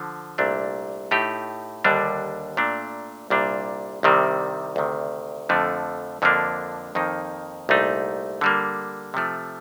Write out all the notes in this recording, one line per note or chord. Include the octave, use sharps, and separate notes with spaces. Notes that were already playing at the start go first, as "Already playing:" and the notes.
Already playing: D3 F3
C2 A#2 A3 D4
A2 A3 D#4 G4
D#2 D3 G3 D4
A#2 A3 D4
C2 A#2 G3 D4
C2 C3 D#3 G3 C4
D2 C3 D#3
F2 D3 F3 A3
F2 D3 F3 A#3 D4
F2 D#3 A#3 D#4
C2 A#2 A3 D#4
D3 G3 A#3
C3 F3 A3